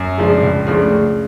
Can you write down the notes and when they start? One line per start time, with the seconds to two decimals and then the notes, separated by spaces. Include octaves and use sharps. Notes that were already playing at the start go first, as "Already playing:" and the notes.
Already playing: F#2
0.18 C#3 F3 G#3 D4
0.42 C#2
0.67 C#3 F3 A3 D4
0.91 C#3